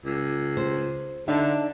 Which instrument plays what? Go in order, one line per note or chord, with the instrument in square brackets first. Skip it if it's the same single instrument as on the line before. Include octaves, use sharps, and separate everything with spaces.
[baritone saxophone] C#2
[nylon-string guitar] C5
[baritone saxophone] D3 [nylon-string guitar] D4 D#4 E5